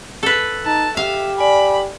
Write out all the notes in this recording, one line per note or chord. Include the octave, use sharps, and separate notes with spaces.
A4 B4
D#4 A5
G4 E5 F5
D5 G#5 B5